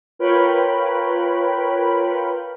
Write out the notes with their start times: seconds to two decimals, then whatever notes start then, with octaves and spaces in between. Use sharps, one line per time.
0.19 F4 A#4 B4 C#5 G5 B5